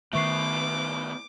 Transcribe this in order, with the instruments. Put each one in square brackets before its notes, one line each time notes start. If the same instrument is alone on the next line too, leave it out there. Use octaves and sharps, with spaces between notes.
[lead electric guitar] A2 B3 [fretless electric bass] D#3 A3 [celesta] E5 C#6 C7 [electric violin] D6